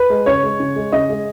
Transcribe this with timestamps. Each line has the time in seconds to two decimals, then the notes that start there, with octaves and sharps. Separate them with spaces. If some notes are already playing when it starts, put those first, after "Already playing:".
Already playing: B4
0.10 G#3
0.26 C#3 C#5
0.43 G#3
0.60 C#3
0.76 G#3
0.92 C#3 D#5
1.09 G#3